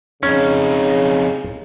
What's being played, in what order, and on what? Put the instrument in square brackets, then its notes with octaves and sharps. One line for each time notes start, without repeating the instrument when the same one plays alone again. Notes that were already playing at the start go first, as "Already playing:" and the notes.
[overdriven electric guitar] F2 D#4 [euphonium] C#3 [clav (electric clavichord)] C#4